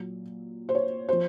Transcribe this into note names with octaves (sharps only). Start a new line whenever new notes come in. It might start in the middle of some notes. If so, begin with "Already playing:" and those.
Already playing: A#2 F#3
C5
C#5
F3 C5